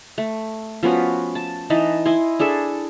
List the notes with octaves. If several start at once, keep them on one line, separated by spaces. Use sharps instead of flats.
A3
F3 B3 C#4 F#4
A5
E3 D#4 D#5 A5
E4 D#5 G#5 C6
D4 G#4 A4 E5